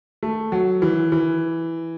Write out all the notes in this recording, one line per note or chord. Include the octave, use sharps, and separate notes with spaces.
A3
F#3
E3
E3